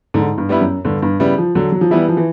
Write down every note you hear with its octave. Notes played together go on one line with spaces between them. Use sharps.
G#2 D3
G2
G3 B3 E4
F#2
G2 D3
G2
C#3 G3 B3 E4
F3
D3 F#3
F#3
F3
E3 G3 B3 E4
F3
E3